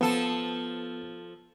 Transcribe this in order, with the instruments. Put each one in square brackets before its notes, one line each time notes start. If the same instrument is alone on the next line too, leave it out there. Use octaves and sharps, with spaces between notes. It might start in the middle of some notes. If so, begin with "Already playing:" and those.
[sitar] F3 A4 [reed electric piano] B3